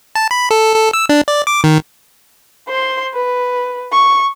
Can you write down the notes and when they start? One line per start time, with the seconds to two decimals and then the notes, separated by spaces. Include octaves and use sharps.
0.15 A5
0.31 B5
0.51 A4
0.76 A4
0.93 E6
1.09 D4
1.28 D5
1.47 D6
1.64 D#3
2.68 C5 C6
3.14 B4
3.92 C#6